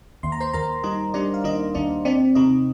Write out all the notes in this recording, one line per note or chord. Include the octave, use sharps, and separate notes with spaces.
D#2 C6
A#5
C5 C6
D#2 A#4 A#5
G3 D#4 D#5
G3 D4 D5
F5
D#2 D#4 D#5
D#2 D4 D5
C4 D4 D5
C3 D#4 D#5